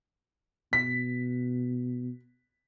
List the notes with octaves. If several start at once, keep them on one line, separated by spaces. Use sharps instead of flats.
B2 B6